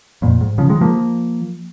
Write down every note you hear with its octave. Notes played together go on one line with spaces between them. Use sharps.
F2 A#2
G#2
C#3 F3
D#3 G#3
F3 A#3